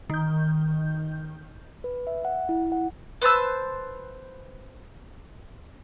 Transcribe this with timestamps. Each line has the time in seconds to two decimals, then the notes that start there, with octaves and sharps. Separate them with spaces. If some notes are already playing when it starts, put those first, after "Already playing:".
0.10 D#3 G6
1.84 B4
2.07 E5
2.25 F#5
2.49 E4
2.72 F#5
3.22 B4 C5 A5 E6